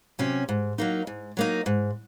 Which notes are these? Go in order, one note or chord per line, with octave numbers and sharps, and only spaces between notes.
C3 F#3 C#4 F#4
G#2
F#3 A#3 D#4
G#2
F#3 A#3 D#4
G#2